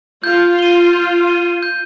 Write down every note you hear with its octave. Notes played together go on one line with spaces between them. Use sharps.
F4 G6
D#7 G7
G6
D#7 G7
G6